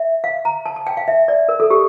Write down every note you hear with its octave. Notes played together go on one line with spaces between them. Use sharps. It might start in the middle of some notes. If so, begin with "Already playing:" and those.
Already playing: E5
F5
A#5
A5
A5
G5
F5
E5
D5
A#4
A4
G4